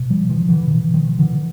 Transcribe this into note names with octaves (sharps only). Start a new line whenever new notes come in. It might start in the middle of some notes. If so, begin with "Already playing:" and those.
Already playing: B2
F3 G3
D#3 F3
D3 E3
B2 D#3
D#3 F3
D3 E3